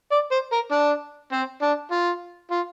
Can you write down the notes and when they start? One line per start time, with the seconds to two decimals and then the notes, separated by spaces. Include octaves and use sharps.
0.12 D5
0.31 C5
0.52 A#4
0.72 D4
1.32 C4
1.62 D4
1.91 F4
2.51 F4